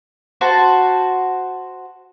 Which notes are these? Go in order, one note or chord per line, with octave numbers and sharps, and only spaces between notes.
F#4 C5 A5